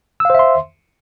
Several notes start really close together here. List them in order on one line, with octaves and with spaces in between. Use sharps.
E6 F5 C5 E5 C6